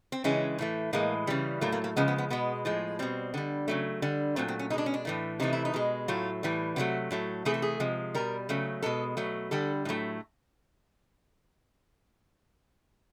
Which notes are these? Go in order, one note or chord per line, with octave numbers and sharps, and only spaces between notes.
C4
C#3 E3 G#3 C#4
A2 E3 A3
A2 E3 G#3 A#3
C#3 E3 G3
A2 F#3 A3 A#3
A#3
A#3
C#3 F3 G#3 B3
B3
B3
B2 G#3 B3
A2 F3 G#3
B2 G3 C4
D3 G3
C#3 F#3 A3
D3 G3
A#2 F#3 A3 C4
C4
C#4
B2 G#3 D4 D#4
C#4
D4
A2 E3 A3
C3 E3 A3 D#4
E4
D#4
B2 G#3
A2 F#3 A3 F4
A2 E3 G3
C3 D#3 F#3 A3 F#4
A2 F#3 A3
C3 E3 A3 G#4
A4
G#4
C3 F3 G#3
B2 G3 A#4
C#3 F#3 A3
B2 G#3 A4
B2 F#3 A3
D3 G3 A4
A2 F#3 A3